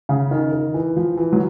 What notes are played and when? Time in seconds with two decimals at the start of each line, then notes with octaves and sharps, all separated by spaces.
0.09 C#3
0.31 D#3
0.53 D#3
0.74 E3
0.96 F3
1.17 E3
1.33 F#3